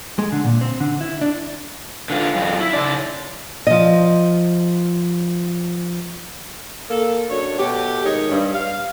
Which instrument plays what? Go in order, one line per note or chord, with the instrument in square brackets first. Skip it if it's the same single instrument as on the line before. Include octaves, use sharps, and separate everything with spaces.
[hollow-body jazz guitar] G#3
D3
A#2
C4
D3
E4
D4
[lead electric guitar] D3 F4
F#2 F4
E4
C#3 D5
[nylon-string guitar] F3 D#5
[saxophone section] A#3 A4
F#2 D4 C#5
B2 A3 G4
D#3 G#3 D#4 C#5 D#5
G2
F5